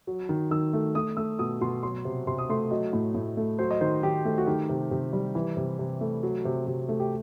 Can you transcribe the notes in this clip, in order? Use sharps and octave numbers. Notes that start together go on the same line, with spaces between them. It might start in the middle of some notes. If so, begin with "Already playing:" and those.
F#3
D#3
D#3 E6
A3
A3 D#6
A3 E6
B2 D#6
B2 C6
F#3 C6
C3
C3 C6
D#6
A3 C6
F#3 D#5
A2
A2
A3
F#3 C5
D#5
D#3 C5
D#3 G4
A3
F#4
D#3 G4
C3
C3
G3
E3
C3
C3
A3
F#3
C3
C3
A3
G4